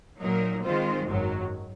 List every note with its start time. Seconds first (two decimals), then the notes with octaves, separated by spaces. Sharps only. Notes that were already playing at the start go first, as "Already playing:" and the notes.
0.21 A#2 F#3 A#3 D#4 A#4
0.64 D#3 G#3 C4 F4 C5
1.07 G#1 F#2 D#3 F#3